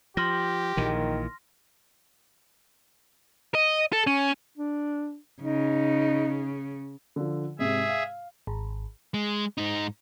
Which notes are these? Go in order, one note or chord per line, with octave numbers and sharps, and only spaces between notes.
F3 G4 C6 F6 A#6
A#1 A#2 D#3 E3
D#5
A4
C#4
D4
C#3 D#4
D3 F3
G#2 C3 G#4 E5
F5
G#1
G#3
G#2 D#4